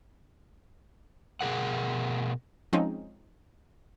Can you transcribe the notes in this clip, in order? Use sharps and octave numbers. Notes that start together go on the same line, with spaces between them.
B2 G#4 A#4 F#5
F3 G#3 C4 C#4 D#4